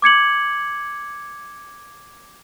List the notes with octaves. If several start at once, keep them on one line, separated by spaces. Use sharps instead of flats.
D6 G#6 C#7 F#7